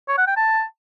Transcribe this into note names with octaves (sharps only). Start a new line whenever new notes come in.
C#5
F#5
G5
A5